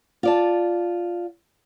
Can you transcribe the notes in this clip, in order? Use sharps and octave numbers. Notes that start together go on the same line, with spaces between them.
F4 D5 A5